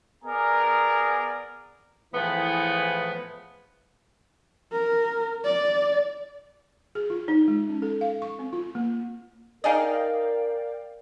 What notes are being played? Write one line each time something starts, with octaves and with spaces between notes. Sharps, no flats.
B3 G#4 A#4 D5 G#5 A#5
A2 E3 F3 B3 G#4
A#4
D5
G#4
F4
D#4
G#3
C#4
A4
F5
C#6
C4
F4
A#3
D#4 G#4 A#4 D5 D#5 F5 G5